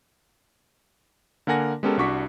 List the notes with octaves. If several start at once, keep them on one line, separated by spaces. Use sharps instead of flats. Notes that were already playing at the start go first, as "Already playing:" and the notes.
D3 A#3 A#4 F#5 G#5 A#6
G#3 B3 C#4 G4 A4 A#4
C2 D4 F#4 C#6 D6 B6